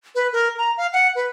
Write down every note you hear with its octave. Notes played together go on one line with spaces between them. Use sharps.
B4
A#4
A#5
F5
F#5
B4